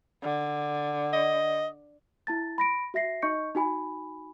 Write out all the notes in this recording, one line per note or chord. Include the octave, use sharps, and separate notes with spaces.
D3
D#5
E4 A5 A6
B5 A#6 D7
F#4 E5 A#6 C7
D#4 D#5 C#6 G6 C#7
D#4 F#4 G#5 B5